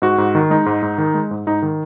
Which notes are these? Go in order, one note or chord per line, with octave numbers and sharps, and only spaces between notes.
G#2 F#4
G#2
D#3
G#3 D#4
G#2
G#2
D#3
G#3
G#2
G#2 D#4
D#3